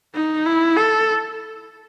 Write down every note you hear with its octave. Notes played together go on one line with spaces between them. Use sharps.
D#4
E4
A4